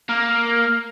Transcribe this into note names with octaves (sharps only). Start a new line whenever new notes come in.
A#3 F6